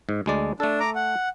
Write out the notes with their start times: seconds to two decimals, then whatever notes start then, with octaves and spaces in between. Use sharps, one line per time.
0.09 G#2
0.26 D2 G#3 D5
0.60 A3 D4 A4
0.80 A#5 D6
0.95 F#5